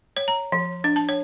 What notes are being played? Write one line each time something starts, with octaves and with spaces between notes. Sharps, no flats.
C#5
A#5
F3
D4
A5
C#5